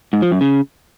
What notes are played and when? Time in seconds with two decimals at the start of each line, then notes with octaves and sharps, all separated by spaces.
0.13 G#2
0.22 F3
0.32 F#2
0.41 C#3